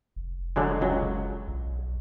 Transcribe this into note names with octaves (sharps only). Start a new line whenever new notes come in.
F1
D3 F#3 G#3
C#2 F#3
B1